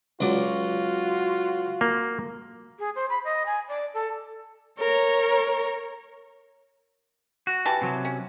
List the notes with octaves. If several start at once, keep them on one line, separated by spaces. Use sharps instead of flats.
C#2 F#3 F4 F#4 D5
A#3
G#4
C5
B5
D#5
G#5
D5
A4
A#4 C#5
F#4
E3 G4 A5
C3 F#3
C#4